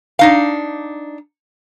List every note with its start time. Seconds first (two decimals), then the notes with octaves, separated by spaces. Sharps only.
0.19 D4 D#4 F5